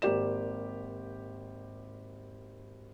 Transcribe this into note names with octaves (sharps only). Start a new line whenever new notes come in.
G#1 A#3 G4 D5 E7